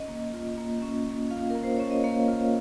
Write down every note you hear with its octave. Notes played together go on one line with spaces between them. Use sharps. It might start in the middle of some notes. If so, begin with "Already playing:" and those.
Already playing: C#4 D#5
A#3
F4
A#3
C#4
A#3
F4 F5
A#4
A#3
C5
C#4 C#5
D#5
A#3 F5
F4